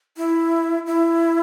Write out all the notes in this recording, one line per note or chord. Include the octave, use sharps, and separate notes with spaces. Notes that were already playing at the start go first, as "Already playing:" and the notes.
E4
E4